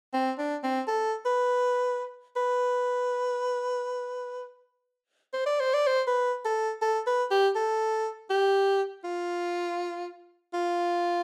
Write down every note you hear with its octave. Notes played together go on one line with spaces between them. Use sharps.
C4
D4
C4
A4
B4
B4
C5
D5
C5
D5
C5
B4
A4
A4
B4
G4
A4
G4
F4
F4